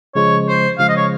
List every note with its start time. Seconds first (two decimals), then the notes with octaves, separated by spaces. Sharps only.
0.15 C#3 F3 G#3 C#5
0.48 C5
0.78 C#3 F3 G#3 F5
0.88 D#5
0.97 C#5